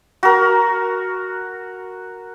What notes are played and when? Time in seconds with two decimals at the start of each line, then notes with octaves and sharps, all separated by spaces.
0.23 F#4 A#4